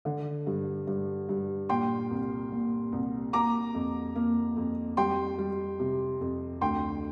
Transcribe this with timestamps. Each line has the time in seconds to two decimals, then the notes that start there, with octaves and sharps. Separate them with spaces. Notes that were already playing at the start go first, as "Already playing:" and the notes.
0.05 D3
0.47 G2
0.87 G2
1.29 G2
1.69 A#2 G5 C6
2.10 C2
2.52 A#2
2.92 C2
3.33 A#3 A#5 D6
3.74 F2
4.15 A#3
4.56 F2
4.97 G3 G5 C6
5.38 G3
5.79 C3
6.21 F2
6.61 D2 G5 C6